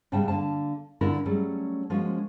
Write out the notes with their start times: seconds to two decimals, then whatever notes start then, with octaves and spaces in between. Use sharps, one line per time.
0.12 G#2 C#3 G3 G5 A5
0.28 D3 A#3 F5 A5
1.01 D3 C#4 D4 E4 F4 A#4
1.25 F#3 G3 A3 C#4 G#4
1.90 F3 G#3 A#3 C#4 F#4